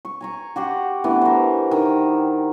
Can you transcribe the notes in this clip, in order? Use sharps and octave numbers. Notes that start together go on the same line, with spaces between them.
C#6
G#5 A#5 C#6
F#4 G4 F#5 C6
E3 A3 B3 D4
A#4 C5
D#3